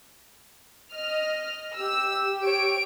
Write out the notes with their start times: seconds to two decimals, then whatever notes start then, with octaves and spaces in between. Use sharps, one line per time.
0.93 D#5 F6
1.76 G4 E6
2.44 C#5 D7